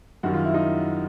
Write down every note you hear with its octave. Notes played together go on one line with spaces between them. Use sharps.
F#2 D#3 G3 F#4
F4
E4
D#4 F4